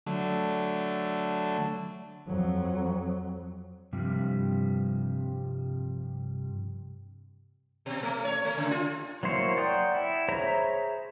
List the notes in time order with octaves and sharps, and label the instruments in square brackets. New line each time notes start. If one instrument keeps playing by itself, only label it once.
[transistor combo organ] D3 F#3 A3
[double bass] F2 F#3
[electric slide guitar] G2 C3 F3 G3
[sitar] B2
A3
C#5
A3
C#3
F4
[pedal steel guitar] F#3 A#3 E4 C5 C#5
D5 F#5 G5 A#5 D#6
E4
G#4 C5 C#5 E5 A#5